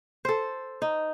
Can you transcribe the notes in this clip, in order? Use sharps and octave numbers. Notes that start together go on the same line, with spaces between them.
A4 C5
D#4